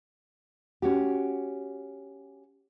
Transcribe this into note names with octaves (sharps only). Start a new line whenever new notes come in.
C#4 F#4 G4